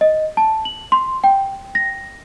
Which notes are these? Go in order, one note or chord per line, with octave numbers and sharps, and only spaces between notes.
D#5
A5
F#7
C6
G5
A#6